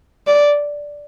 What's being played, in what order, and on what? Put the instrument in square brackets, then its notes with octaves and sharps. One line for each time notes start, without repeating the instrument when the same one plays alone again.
[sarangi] D5